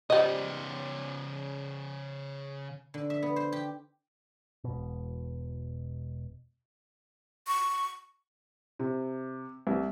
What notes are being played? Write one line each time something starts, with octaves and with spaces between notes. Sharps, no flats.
C#3 G3 C5 D#5
D3
E5
B3
C5
G4
E1 B2
C#6
C3
C2